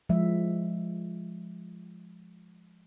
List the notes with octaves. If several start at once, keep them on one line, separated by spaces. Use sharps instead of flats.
F3 G#3 E5